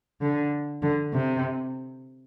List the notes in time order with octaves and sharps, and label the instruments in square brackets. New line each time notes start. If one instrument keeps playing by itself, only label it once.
[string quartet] D3
D3
C3